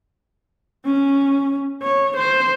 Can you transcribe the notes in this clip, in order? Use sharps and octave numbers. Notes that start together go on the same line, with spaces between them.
C#4
C#5
C5